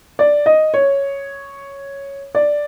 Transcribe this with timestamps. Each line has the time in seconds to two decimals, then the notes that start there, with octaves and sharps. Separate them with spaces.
0.19 D5
0.46 D#5
0.74 C#5
2.35 D5